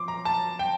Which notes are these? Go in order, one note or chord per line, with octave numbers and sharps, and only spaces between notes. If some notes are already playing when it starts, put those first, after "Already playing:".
Already playing: F3 C6 D6
A#5
A5
G5